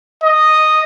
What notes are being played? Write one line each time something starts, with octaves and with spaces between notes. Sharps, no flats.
D#5